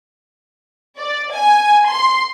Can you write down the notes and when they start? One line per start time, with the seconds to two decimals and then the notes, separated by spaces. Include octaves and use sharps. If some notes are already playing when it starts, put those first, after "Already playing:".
0.97 D5
1.32 G#5
1.87 C6